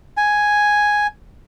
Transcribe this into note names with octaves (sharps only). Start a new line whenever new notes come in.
G#5